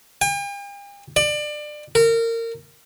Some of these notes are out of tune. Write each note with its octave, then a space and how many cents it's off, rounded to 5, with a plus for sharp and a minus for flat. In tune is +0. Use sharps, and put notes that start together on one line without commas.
G5 +45
D5 +25
A#4 -25